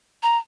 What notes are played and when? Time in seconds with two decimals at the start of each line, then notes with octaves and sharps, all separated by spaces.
0.23 A#5